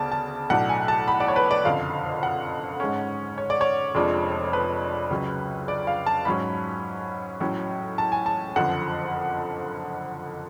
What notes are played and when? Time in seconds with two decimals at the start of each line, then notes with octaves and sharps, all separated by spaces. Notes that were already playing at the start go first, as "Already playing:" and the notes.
Already playing: D2 C#3 B3 D5 A5
0.12 A5
0.50 B1 A2 F#3 A3 D4 F#5
0.69 G#5
0.88 A5
1.08 B5
1.20 D5
1.28 C#5
1.36 B4
1.51 D5
1.65 F#1 F2 D3 F5
2.23 F#5
2.80 G#2 G#3 C#4
3.38 C#5
3.50 D5
3.61 C#5
3.95 F1 F2 F3 G#3 D4
4.53 B4
5.10 C#2 C#3 F#3 C#4
5.68 D5
5.87 F5
6.06 A5
6.25 G#2 F#3 C#4 B5
7.40 A1 A2 F#3 C#4
7.98 A5
8.12 G#5
8.26 A5
8.56 F#1 F2 D3 F3 F#5